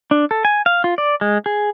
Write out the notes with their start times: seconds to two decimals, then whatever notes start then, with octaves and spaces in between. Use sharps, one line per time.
0.11 D4
0.31 A4
0.45 G#5
0.66 F5
0.84 F4
0.98 D5
1.21 G#3
1.46 G#4